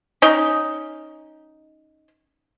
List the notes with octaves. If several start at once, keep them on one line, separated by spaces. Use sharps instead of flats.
C#4 D#4